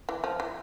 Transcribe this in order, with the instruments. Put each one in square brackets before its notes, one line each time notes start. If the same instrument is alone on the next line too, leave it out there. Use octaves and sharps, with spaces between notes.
[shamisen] E3
F3
E3